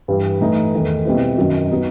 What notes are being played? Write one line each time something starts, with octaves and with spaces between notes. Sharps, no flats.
G2 E3 G3
A2 E3 A3 D#4
E2 D#3 A3
B2 G3 C4 E4
F#2 D#3 F#3
F#3 B3 D#4